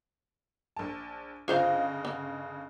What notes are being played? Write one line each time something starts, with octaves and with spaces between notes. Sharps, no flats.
A#1 A5
G1 C#3 F4 C5 D#5 F5
B3